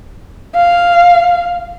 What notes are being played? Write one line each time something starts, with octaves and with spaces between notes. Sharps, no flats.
F5